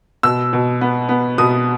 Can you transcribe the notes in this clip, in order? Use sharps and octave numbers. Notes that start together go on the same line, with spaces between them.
B2 E6
B2
B3
B3
B2 D#6